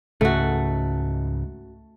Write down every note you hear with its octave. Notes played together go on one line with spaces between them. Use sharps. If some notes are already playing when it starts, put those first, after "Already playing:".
C#2 G#2 C#3 A3 F#4